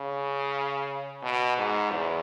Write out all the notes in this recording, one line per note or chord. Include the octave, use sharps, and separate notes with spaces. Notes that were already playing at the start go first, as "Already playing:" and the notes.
Already playing: C#3
B2
G#2
E2